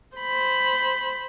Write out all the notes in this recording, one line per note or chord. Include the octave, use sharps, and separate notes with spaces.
C5 B5